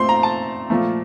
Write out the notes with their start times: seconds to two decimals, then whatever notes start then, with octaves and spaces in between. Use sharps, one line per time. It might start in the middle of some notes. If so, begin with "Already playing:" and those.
Already playing: A#2 A3 C4 C6
0.09 A#5
0.23 A5
0.70 A#2 F3 A3